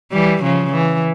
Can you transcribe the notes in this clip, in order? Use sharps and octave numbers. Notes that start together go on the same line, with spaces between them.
E3 G3
C#3 F3
E3